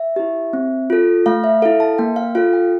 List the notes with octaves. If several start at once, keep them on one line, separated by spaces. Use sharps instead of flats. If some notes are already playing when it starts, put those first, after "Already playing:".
Already playing: E5
E4 G4
C4
F4 A4
A3 F5
E5
E4 A4 F5
A5
A#3 G5
F5
F4 A4 F5
G5